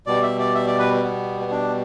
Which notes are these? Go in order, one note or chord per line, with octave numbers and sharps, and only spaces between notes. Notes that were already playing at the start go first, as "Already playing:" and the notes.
B2 G3 D5
E5
D5
E5
D5
B4
B3
B3
D4